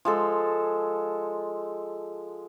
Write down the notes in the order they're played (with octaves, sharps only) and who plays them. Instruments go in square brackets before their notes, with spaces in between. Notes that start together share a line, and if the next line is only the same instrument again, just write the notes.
[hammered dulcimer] F3 G#3 A4